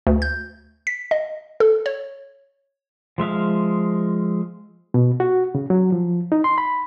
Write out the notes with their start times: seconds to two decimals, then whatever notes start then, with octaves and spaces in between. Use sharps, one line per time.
0.07 D2
0.22 G6
0.87 B6
1.11 D#5
1.60 A4
1.86 C#5
3.18 F3 G#3 E5 F5
4.94 B2
5.20 F#4
5.55 C#3
5.70 F#3
5.92 F3
6.32 D#4
6.44 C6
6.58 B5